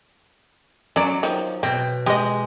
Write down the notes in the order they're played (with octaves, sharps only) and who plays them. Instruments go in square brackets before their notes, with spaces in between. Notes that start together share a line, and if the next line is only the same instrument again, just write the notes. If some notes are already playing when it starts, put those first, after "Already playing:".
[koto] F#3 [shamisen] C#4 D5
[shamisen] D#3 F3
[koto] B2 [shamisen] C4
[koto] G#3 [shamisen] G4 D#5